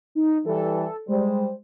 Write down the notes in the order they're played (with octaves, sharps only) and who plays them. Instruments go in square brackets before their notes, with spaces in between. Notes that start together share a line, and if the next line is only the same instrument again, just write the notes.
[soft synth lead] D#4
[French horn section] E3 G3 [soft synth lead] A4
[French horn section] G3 C5 [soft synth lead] G#3